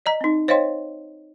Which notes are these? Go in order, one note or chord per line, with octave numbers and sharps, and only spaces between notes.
D5 D#5 A#5
C4 D#4
C5 C#5 D#5 F5 G5 C6